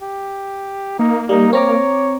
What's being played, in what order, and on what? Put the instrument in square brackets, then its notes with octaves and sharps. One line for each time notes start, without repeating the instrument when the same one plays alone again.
[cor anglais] G4
[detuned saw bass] A#3 [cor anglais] D#4
[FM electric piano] G3 [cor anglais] D#4
[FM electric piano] C4 A#5 D6 [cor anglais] C#5